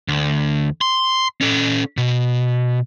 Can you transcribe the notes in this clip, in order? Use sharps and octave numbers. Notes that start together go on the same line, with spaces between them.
D2
C6
C#4 A4
B2